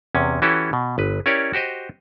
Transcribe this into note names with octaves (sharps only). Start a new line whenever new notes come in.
E2 C3 C#4
E3 C#4 E4 F#4 G4 A4
B2
G1 B4
C#4 E4 G4 A#4 C#5 D5
F#4 G4 C5 D#5